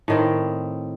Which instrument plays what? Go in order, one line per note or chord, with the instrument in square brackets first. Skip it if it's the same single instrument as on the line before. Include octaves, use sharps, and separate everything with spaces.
[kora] A2 D#3 C4